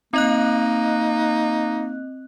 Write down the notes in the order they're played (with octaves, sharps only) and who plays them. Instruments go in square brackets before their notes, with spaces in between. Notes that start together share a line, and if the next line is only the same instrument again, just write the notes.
[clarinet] A#3 [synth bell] C4 D#5 F#6 [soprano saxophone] D#4